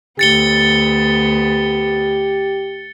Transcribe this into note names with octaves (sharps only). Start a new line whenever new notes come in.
D2 B3 G4 A6 C#7 G7